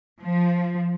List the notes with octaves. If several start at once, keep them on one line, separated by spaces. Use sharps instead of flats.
F3